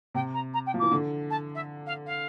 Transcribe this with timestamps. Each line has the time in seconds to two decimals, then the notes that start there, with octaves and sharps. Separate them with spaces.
0.14 C3 G5
0.34 A#5
0.54 A#5
0.66 G5
0.74 F3
0.79 E3 D6
0.91 D3
1.30 A5
1.55 E5
1.86 F5
2.06 F5